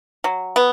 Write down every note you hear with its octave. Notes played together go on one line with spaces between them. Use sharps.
F#3
B3